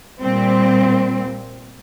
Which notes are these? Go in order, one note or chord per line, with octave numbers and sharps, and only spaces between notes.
A#2 G3 C4